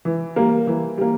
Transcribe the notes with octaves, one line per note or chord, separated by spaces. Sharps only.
E3
G3 A#3
E3
G3 A#3